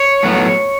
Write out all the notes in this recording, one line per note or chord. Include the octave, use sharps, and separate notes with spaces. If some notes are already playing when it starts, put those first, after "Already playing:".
Already playing: C#5
A2 F#3 B3